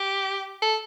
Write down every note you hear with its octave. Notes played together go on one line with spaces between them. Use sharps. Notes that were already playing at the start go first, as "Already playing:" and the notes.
Already playing: G4
A4